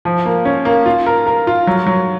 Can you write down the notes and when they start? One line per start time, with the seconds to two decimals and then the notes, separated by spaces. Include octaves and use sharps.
0.05 F3
0.25 A#3
0.45 C#4
0.65 A#3
0.86 F4
1.06 A#4
1.27 A#4
1.47 F4
1.67 F#3
1.86 F#3